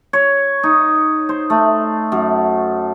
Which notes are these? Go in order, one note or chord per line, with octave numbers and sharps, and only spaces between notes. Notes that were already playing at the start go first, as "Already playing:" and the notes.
C#5
D#4
C5
A3
F#2